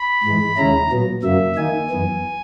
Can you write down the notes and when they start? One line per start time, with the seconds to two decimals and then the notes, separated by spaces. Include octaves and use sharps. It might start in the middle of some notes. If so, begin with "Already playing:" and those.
Already playing: B5
0.24 G#2 E3 G#3
0.57 D#2 C#3 G#3 C#4 E4 A#5
0.90 A#2 F#3 B3
1.23 F#2 C#3 F#3 A#3 E5
1.56 D#3 A#3 D#4 G#5
1.90 F#2 E3 B3